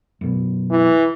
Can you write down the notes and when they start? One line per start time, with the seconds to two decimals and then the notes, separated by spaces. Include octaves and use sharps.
0.21 F#2 B2
0.70 E3